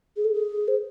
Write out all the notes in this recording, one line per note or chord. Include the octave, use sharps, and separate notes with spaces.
G#4
A4
G#4
C5